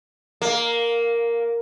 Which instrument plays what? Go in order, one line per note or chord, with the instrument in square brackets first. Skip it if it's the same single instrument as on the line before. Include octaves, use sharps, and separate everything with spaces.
[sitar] A#3